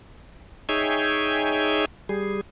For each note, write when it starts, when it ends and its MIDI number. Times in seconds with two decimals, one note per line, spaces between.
0.69 1.85 63
0.69 1.85 68
0.69 1.85 73
0.69 1.85 76
0.69 1.85 79
0.69 1.85 80
2.09 2.41 55
2.09 2.41 68